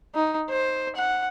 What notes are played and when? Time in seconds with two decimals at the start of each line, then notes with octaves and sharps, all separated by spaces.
0.15 D#4
0.50 C5
0.96 F#5